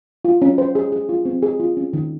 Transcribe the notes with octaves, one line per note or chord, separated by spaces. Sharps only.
F4
C#4
C5
G#4
G#4
F4
C4
G#4
F4
C#4
D#3